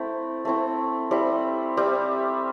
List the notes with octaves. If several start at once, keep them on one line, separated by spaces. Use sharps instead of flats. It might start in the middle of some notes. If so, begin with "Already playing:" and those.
Already playing: A3 C4 E4
A3 C4 E4
G3 C4 E4
G3 C4 E4